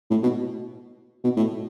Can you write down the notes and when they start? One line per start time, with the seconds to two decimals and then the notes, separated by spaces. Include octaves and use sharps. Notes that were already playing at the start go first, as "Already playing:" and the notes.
0.11 A2
0.23 B2
1.24 B2
1.37 A2